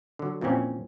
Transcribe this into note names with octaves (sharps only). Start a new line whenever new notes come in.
D3 F#3
F2 A#2 E3 C4 C#4